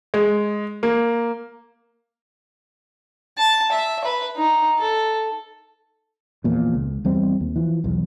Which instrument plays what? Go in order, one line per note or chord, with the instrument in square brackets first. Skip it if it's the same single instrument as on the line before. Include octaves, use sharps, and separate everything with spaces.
[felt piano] G#3
A#3
[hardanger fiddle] A5
E5
B4
D#4
A4
[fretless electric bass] E2 A#2 F3
C#2
E2 G3 C4
D#2
E3 F3
B1 E2